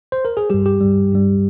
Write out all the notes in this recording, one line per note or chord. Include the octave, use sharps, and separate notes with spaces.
C5
A#4
G#4
G2 G3 G4
G4
G2 G3
G2 G3